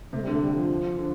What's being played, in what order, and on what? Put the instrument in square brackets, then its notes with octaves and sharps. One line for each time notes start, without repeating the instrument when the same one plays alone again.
[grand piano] C3 [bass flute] A3
[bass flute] G3
[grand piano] D3 [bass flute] A3
[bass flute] G3
F3
[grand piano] D3